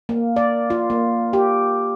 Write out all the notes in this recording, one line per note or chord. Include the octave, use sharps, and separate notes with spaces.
A#3
D5
F4
A#3
G4